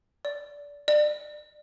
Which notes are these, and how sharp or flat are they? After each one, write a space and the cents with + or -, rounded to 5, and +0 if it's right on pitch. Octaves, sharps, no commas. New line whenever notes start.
D5 -20
D5 +25